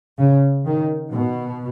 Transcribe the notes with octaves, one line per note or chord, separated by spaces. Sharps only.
C#3
D#3
B2